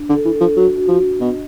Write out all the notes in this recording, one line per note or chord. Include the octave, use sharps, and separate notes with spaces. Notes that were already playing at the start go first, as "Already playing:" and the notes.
Already playing: D4
D3
A4
E3
D4
F3
F#3 F#4
F#4
F3
D4
B2 D#5